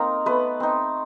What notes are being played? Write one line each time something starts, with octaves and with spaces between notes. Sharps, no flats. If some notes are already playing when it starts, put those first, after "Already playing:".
Already playing: A#3 C4 D#4 A#4
A3 B3 B4
C4 D#4